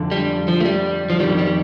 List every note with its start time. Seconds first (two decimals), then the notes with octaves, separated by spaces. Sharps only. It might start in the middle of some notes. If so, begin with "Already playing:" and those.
Already playing: F2 D3
0.12 G3
0.48 F3
0.60 A3
0.65 G3
1.10 F3
1.20 F2 D#3 G3
1.38 G3